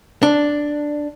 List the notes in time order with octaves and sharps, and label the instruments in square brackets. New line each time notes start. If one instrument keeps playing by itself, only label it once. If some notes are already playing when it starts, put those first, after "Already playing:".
[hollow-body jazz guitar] D4